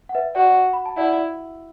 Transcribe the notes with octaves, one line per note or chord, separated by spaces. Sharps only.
F#5
B4 E5
F#4 D5 F#5
B5
A5
E4 D5 F#5